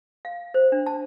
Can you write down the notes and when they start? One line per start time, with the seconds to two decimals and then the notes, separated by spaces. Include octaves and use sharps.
0.25 F5
0.54 C5
0.72 D4
0.86 A5